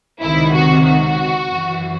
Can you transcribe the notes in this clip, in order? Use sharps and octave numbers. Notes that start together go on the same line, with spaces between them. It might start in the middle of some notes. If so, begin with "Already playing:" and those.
C#2 C3 D#3 E4
F#4
F#4
F#2 E3